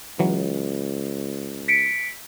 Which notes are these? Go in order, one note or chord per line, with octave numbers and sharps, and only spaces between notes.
C#2 E3 F#3
B6 C#7 D7